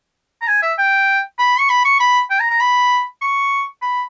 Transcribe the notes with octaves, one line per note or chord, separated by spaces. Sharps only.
A#5
G#5
E5
G5
B5
C#6
B5
C#6
B5
G5
A#5
A#5
B5
C#6
B5